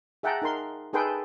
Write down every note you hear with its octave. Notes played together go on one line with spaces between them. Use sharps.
G#4 E5 F#5 G5 A5 A#5
D#4 A#4 C6
D#4 G#4 A4 B4 G5 C6